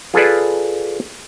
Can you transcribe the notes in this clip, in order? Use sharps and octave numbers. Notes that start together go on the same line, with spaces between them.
F4 G#4 A4 B4 D5